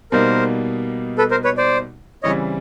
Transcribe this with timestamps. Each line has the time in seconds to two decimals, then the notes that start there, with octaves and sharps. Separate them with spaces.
0.12 B2 G3 A#3 D#4 A#4 C5
1.18 A4 B4
1.31 A#4 C5
1.44 B4 C#5
1.57 C5 D5
2.23 C#3 E3 G3 C4 E4 C#5 D#5